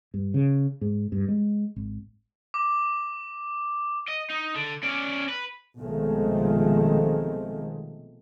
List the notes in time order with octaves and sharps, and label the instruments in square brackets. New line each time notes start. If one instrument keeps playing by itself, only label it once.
[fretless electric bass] G2
C#3
G#2
G2
G#3
G#1
[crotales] D6
[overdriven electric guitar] D#5
D#4
D3
C#4 D5
B4
[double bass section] B1 C3 D#3 F3 G#3 A3